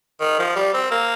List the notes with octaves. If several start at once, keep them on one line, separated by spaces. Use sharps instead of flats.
D#3
F3
G3
C4
A#3